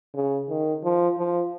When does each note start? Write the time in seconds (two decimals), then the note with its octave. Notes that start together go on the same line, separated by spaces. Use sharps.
0.15 C#3
0.49 D#3
0.84 F3
1.18 F3